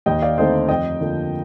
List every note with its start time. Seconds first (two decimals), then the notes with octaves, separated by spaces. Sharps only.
0.06 D#2 D#5 G5
0.22 D5 F5
0.38 D3 A3 C4 D#4 C5 D#5
0.69 F2 D#5 G5
1.00 D3 F3 A#3